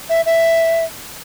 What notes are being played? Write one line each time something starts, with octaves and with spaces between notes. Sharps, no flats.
E5
E5